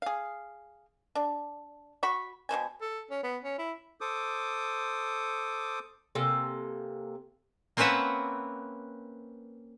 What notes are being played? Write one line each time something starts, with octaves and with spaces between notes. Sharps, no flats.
G#4 F5
D4
F#4 B5 C#6
B2 D#4 C5 G#5
A4
C#4
B3
C#4
E4
A4 C5 D6 D#6
C3 A#3 A4 G#5
A#3 C4 C#4 B4 E5 F#5